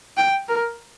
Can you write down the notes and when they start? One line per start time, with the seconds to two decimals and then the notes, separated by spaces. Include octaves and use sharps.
0.17 G5
0.49 A#4